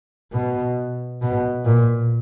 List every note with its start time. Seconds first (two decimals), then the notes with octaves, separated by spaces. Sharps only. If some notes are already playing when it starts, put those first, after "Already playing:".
0.32 B2
1.21 B2
1.65 A#2